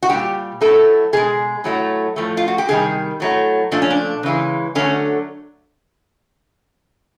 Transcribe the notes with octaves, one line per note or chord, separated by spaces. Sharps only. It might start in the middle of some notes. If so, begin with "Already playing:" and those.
F#4
A#2 G3 G4
A2 F#3 A3 A4
B2 G#3 G#4
A2 F#3 A3
A2 F3 A3
F4
F#4
G4
C3 D#3 G3 G#4
A2 F#3 A3
A#2 F3 A3 D4
C#4
D4
C#3 E3 G#3
D3 F#3 A3 C#4